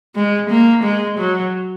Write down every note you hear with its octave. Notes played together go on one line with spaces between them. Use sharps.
G#3
A#3
G#3
F#3